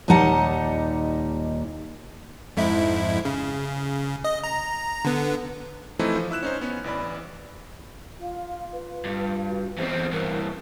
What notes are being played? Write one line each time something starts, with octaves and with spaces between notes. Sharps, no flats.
D#2 A#2 G3 D#4 F#5 A5
F2 G#2 E4
C#3
D#5
A#5
D3 B3
E3 F3 A3 C4 D#4 E4
F3
E4 E6 F#6 E7
C#4 D#4 C5
B3 C#4 C#5
A1 E3 D5 B5
F4 F5
B4
G2
F#4
E2 C4 C5
G2 E3 A#4